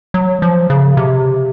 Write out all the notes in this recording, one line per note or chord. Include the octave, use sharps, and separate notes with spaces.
F#3
F3
C#3
C3